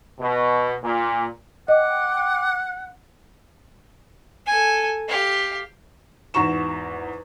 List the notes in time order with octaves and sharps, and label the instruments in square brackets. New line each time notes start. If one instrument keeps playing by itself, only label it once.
[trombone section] B2
A#2
[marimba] D#5 [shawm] F#5 [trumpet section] G5 D6
[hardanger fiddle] A4 G#5
G4 F5
[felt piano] E2 G#2 F#4 A#5 C#6 E7